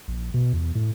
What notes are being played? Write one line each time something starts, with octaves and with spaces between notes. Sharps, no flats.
A#1
B2
E2
A2